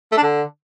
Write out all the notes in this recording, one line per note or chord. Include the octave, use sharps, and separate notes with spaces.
A3
D4
D3